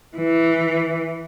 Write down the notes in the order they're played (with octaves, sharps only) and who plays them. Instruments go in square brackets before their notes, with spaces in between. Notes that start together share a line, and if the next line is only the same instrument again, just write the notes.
[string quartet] E3